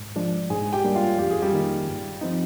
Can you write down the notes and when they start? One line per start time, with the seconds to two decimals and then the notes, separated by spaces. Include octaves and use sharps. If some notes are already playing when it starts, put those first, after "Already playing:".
Already playing: G#2
0.16 F3 G#3 D4
0.50 G#2 G#4 G#5
0.73 G4 G5
0.84 G3 A#3 D4
0.95 F4 F5
1.18 F2 G4
1.30 G#4
1.42 G3 G4
1.53 D#3 A#3 D#4
1.88 G2
2.21 F3 C4 D#4